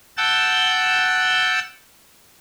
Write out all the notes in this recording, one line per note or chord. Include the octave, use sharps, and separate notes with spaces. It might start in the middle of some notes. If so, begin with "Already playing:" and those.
F#5 G5 A5 E6 G6